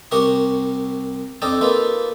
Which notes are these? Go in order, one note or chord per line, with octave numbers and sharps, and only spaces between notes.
C2 F#4 G4 A#4 F#5 D#6
F2 D4 D#4 A4 D#5 G5
A#3 D#4 F4 A4 B4